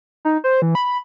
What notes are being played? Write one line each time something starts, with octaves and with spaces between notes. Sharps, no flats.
D#4
C5
E3
B5